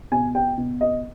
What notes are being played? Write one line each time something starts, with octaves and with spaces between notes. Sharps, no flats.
B2 G#5
G5
B2
D#5